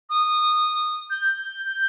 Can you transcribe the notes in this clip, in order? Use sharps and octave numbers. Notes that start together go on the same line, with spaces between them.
D#6
G6